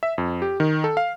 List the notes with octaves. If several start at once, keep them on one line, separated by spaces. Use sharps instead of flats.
E5
F2
G4
D#3
A4
F5